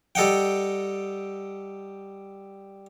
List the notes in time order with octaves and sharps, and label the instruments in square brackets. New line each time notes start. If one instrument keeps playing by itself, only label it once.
[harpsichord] G3 A4 D#5 F#5 G5